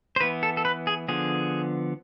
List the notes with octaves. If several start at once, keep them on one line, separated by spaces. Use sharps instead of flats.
C5
E3 B3 B4
A4
A4
B4
G#4
D3 F3 B3 G#4